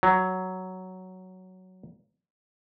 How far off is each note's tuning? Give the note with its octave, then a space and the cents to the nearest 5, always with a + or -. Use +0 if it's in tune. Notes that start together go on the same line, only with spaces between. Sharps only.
F#3 +5